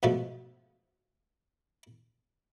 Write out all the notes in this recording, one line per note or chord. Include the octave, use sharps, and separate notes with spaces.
G#2 B2 F3 A3